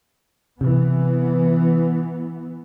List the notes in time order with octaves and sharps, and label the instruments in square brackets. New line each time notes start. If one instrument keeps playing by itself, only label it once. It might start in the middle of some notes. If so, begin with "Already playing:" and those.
[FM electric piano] C3 [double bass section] E3 B3